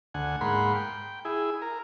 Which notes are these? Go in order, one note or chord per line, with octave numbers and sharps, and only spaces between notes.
D2 F#5 G#5
G#2 A#3 F#5 B5 C6
G5
E4 G#4
A#4